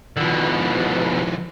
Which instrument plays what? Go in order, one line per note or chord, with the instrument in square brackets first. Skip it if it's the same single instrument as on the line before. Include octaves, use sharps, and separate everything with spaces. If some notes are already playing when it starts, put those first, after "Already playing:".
[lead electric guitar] B2 D3 [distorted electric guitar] D#3 F3